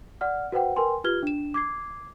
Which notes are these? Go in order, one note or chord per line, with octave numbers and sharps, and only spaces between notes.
D5 F#5 F6
F#4 B4 C5 F#5 G5
A#4 B4 G5 G#5 C6
F4 G4 B4 F6 G#6 G7
D4 E7
D6 G#6 C7